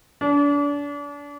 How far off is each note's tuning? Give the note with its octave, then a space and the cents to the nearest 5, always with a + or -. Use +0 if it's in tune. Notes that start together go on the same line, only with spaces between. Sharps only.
D4 -35